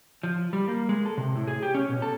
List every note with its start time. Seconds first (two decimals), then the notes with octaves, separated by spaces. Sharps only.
0.23 F3
0.53 G3
0.68 A#3
0.89 G#3
1.06 A4
1.18 C3
1.36 A2
1.47 G#4
1.63 G4
1.74 C#4
1.89 B2
2.02 A4